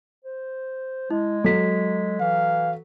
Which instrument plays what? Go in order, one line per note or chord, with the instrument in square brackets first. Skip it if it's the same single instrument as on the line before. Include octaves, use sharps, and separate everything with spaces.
[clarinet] C5
[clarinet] G#3 [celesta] E4
[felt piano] F#3 [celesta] A4 B6
[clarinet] E3 [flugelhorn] F5